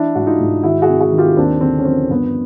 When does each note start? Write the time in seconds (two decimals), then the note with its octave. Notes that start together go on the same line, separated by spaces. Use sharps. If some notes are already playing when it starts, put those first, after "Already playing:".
Already playing: E3 D4 E4
0.15 G#2 F#4
0.27 D#4 F4
0.40 G#2
0.63 D#3 E4 F#4
0.82 F#4 G#4
0.88 C3
1.00 F#4 G#4
1.12 D#3
1.18 F4 G4
1.37 D#2 C4 D4
1.61 D3 C4
1.79 C#4
1.85 F3 C4
2.10 G2 B3